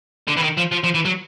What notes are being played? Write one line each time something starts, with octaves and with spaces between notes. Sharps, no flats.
D3
E3
D#3
F3
F3
F3
E3
F#3